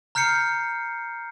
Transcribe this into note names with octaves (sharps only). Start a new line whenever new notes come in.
A#5 F6 G6 C7 C#7